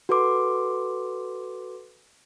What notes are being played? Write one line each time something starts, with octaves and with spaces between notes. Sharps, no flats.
F#4 A4 B4 C6 D6